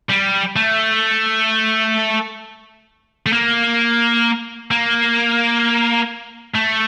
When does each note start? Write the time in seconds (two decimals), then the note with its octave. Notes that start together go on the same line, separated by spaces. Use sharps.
0.10 G3
0.56 A3
3.26 A3
3.33 A#3
4.71 A#3
6.54 A3